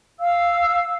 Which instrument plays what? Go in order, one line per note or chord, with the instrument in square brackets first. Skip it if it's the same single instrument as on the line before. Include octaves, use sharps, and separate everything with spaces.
[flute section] F5 E6